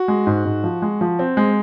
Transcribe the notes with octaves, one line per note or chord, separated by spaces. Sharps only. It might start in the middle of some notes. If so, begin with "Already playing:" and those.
Already playing: F#4
G#3
G#2
G#2
F3
G#3
F3
C4
G#3